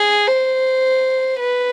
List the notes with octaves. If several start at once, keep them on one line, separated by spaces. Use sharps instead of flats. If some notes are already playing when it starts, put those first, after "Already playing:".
Already playing: G#4
C5
B4